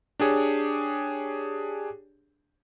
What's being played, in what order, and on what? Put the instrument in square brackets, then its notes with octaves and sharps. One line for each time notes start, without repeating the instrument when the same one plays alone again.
[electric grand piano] D4 G4 G#4 C#5